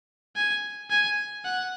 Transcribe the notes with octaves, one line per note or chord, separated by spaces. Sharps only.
G#5
G#5
F#5